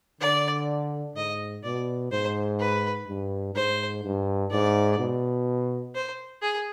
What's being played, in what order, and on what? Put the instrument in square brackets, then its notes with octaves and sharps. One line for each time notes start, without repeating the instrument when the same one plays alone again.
[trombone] D3 [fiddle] D5
[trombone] G#2 [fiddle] D#5
[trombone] B2 [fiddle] D5
[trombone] G#2 [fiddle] C5
[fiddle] B4
[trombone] G2
[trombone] G#2 [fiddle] C5
[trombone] G2
[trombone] G#2 [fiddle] D5
[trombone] B2
[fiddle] C5
G#4